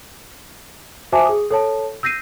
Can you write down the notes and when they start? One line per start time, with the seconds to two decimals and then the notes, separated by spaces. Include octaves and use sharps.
1.12 F#4 C5 E5 G#5 A5 D6
1.26 G#4 D#6
1.51 A4 C#5 A5
2.03 E6 G6 A#6 C7 D#7